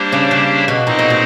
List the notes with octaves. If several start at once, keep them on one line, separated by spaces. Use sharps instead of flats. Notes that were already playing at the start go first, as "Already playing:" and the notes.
Already playing: G3 A#3 D4 G4 C5
C#3
C#3
B2
A#2 C4 D#4 G#4 C5 D#5
B2
A#2